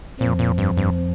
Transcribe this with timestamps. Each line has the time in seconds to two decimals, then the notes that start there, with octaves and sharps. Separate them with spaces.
0.20 F2 A#2 F3
0.39 A#2
0.58 G2
0.77 G2